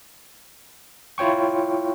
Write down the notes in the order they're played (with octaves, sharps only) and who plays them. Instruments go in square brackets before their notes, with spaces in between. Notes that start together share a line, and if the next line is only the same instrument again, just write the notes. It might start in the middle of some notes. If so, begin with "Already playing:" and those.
[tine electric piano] E4 F4 C#5 G5 C#6